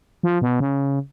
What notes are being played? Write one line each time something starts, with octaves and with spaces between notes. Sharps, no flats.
F3
B2
C#3